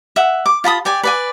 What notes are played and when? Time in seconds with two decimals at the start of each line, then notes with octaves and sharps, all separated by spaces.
0.16 E5 F#5
0.46 D6
0.64 F4 A5 B5 D#6
0.85 G4 D5 G#5
1.03 B4 D5 G#5